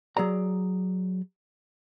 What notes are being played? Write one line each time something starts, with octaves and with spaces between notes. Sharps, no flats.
F#3 G#4 D5 A#5